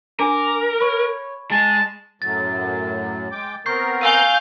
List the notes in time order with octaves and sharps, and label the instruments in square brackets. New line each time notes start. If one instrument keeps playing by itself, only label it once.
[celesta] D4 G#5 [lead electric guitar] A#4 [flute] D6
[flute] C#5 [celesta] B5 C#6
[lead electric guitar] G#3 [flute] G#5 [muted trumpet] A5
[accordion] F#2 A2 F#3 [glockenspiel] A6
[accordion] G#3 G5 D6
[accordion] B3 C4 A#4 [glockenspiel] C#6 G6 C7
[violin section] F5 G6 [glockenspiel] G#5 E6 D#7